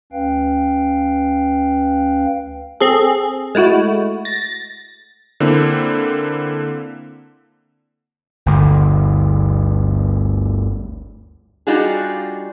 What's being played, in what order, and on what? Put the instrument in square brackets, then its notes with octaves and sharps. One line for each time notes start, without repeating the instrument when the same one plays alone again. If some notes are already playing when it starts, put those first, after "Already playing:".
[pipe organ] D2 C#4 B4 F5 G5
[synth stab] C4 G#4 A4
G#3 A3 E4 F#4
A6 A#6
[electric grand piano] D3 A#3 C4 E4
[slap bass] G1 D2
[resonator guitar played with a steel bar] G3 D4 D#4 F4 F#4 G#4